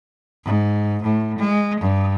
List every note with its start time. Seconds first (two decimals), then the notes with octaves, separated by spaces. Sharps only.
0.44 G#2
1.03 A2
1.39 G#3
1.80 G2